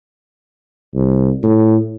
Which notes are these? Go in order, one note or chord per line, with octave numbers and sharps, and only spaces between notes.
C2
A2